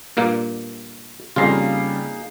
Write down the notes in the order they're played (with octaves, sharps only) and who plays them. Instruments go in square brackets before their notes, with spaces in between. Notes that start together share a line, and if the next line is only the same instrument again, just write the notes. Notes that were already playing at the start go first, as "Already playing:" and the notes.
[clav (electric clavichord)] G2 A#2 A#3
[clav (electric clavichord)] F2 F4 [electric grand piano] C#3 G3 C7 [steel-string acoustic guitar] A#3 D#4 G#4